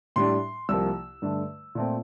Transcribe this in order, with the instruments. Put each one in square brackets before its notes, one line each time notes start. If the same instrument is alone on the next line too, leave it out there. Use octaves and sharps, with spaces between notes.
[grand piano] A2 G3 D4 C6
C2 C3 F3 A#3 E6
G2 D3 A3
A#2 A3 C4